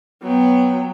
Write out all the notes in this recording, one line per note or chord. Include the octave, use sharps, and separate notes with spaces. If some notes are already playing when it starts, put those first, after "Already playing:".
F#3 B3 G5